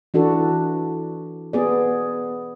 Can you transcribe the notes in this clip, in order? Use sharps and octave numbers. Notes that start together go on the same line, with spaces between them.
E3 D4 F#4 A4
B3 G#4 D5